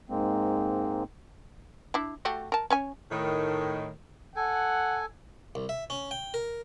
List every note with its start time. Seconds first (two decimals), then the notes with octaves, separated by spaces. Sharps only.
0.09 G#2 G#3 A#3 C4
1.94 D4 E4
2.25 A3 F#4 G4
2.52 A#4 A5
2.70 C#4 C#5 G#5
3.10 A2 D#3
4.36 A4 F#5 G#5
5.55 C2
5.69 E5
5.90 C#4
6.11 G5
6.34 A#4